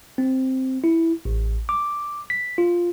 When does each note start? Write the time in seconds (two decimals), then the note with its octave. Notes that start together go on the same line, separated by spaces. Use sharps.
0.18 C4
0.84 E4
1.25 A1
1.69 D6
2.30 B6
2.58 F4